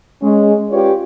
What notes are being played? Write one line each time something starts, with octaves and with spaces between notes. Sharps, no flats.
G#3 C#4
C#4 F4 G4 B4 C#5 D5